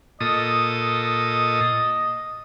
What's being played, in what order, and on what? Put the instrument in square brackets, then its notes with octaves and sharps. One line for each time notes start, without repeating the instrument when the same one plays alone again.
[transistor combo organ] A#2 A4 D#6 [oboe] D#5